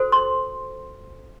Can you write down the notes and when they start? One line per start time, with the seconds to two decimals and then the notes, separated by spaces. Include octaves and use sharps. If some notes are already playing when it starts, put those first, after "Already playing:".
Already playing: F#4 A4 C5
0.12 C6